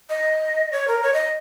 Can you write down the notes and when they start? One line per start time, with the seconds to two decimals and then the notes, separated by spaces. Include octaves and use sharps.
0.09 D#5
0.72 C#5
0.88 A#4
1.03 C#5
1.14 D#5